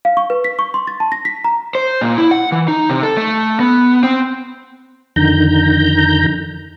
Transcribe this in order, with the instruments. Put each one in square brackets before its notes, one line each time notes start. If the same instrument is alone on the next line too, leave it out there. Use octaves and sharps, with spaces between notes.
[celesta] F5
C#6
B4
B6
C#6
C6
A6
A5
A#6
B6
A#5
[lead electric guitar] C5
A#2
E4
F#5
E3
D#4
C3
A4
A3
B3
C4
[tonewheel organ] F2 D3 D#3 A#5 G6